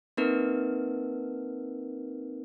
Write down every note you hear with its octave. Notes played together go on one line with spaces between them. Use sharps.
A#3 C4 D#4 A#4 B4